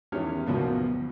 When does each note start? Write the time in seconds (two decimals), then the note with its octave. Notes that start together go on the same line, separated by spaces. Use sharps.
0.12 E2 D#3 C#4 G4 C#5 F6
0.46 D2 B2 F3 F#3 A#3